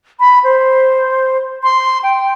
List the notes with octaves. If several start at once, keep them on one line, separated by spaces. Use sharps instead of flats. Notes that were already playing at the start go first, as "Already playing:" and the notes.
B5
C5
C6
G5